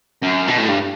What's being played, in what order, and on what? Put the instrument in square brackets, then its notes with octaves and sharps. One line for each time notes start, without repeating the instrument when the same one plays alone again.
[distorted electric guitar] F#2
B2
A2
G2